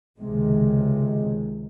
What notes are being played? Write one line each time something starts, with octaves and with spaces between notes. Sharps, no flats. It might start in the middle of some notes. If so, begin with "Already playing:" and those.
C#2 C3 D#3 G#3